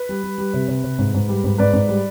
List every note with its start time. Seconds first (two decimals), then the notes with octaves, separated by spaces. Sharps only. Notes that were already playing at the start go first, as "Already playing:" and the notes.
Already playing: B4
0.09 G3
0.23 G3
0.38 G3
0.54 C3
0.68 C3
0.84 C3
0.98 G#2
1.14 G#2
1.28 G3
1.44 G#2
1.58 G#2 B4 D5
1.73 G#2
1.89 G3